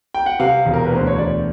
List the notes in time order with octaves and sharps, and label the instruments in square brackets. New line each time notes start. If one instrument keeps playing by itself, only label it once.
[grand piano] G5
F#5
C3 F5
E1
A#4
B4
D2 C5
C#5
E1 D5